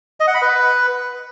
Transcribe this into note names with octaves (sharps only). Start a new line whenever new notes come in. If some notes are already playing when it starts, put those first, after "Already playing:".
D#5
F#5
B5
B4